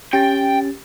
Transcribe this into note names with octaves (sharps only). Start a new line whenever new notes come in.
C#4 G4 G5 A6